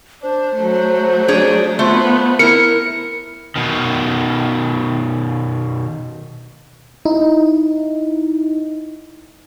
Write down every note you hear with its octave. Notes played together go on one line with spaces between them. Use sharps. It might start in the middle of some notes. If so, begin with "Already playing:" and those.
D4 C5
F#3 A3
D4 G#4 C#5
A3 B3 F4
E4 A#4 C#7
B2 D#3
D#4 E4